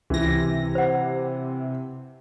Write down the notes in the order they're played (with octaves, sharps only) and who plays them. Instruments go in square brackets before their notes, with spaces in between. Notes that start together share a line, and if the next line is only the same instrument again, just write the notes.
[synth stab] C#2 A#6 [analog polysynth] C3 [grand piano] E3
[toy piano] C5 F#5